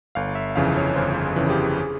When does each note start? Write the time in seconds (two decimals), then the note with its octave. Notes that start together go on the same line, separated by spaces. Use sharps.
0.15 G1 F5
0.35 E5
0.56 F2 C#3 E3 F5
0.77 C#5
0.96 G1 C5
1.36 F2 C#3 E3
1.46 G#4
1.50 G4
1.77 G#4